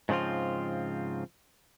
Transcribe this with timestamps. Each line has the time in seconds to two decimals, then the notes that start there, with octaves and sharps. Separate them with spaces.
0.09 G#2 C#3 F3 C4 F4